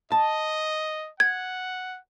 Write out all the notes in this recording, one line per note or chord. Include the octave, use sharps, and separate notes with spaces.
D#5 A5
F#5 G#6